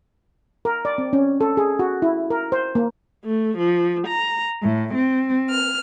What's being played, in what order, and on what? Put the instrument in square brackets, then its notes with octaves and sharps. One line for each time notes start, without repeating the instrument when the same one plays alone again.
[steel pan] A#4
D5
C4
C#4
A4
G#4
F#4
E4
A#4
C5
A#3
[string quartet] A3
F3
A#5
A2
C4
F6